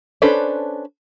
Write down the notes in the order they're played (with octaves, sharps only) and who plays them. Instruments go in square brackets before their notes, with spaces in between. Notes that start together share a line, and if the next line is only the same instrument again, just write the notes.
[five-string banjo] C#4 D4 A4 B4 C5